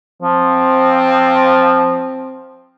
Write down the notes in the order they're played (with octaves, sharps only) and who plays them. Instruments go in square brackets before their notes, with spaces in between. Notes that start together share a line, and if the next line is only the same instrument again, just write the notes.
[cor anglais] F3 [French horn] C4